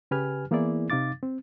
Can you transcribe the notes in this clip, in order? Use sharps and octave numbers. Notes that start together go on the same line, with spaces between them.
C#3 G4 B4 G#5 F6
E3 A#3 B3 E4 G#4 D5
C3 D#4 F5 D6 A6
C4